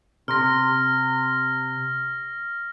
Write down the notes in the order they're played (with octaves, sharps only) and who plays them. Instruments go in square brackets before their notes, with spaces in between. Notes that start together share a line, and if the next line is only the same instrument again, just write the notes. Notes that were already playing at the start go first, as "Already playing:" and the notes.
[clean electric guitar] C3 [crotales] F6 A#6